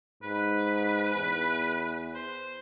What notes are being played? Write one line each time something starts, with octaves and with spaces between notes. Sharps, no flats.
G#2 B4
E2
C5